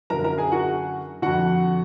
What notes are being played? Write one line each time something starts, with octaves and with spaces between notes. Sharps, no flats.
F#2 D3 A#4 A#5
A#4 A#5
G#4 G#5
F#4 F#5
F2 D3 F#4 F#5